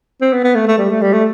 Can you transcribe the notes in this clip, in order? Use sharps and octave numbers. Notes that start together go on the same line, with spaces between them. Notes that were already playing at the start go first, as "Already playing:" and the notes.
C4
B3
B3
A3
A3
G3
A3
G3
A3